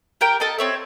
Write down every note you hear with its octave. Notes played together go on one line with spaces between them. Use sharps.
G4 A#4 G5
A4 D#5 F5 A5
C4 C#5 E5